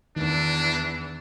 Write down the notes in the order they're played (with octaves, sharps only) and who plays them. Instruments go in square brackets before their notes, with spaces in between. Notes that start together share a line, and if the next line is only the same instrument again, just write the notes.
[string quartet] E2 E3 [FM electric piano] D#3 [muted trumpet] D4